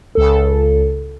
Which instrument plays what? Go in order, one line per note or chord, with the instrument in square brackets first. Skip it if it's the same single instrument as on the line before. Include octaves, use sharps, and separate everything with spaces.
[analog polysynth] C#2 A4